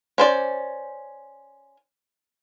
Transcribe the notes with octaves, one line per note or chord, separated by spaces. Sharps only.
C#4 C5 D5